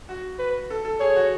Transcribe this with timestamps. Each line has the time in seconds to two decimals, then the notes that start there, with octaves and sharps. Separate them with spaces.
0.09 F#4
0.39 B4
0.70 A4
0.85 A4
1.00 G#4 C#5
1.16 F#4